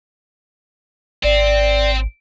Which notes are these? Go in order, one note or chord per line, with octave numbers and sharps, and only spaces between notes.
G#1 C4 D5